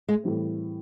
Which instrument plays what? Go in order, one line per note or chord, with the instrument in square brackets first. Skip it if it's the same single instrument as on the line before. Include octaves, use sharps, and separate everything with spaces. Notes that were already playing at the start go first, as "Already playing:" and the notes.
[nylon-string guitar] G#3
[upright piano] A2 E3 G3 C4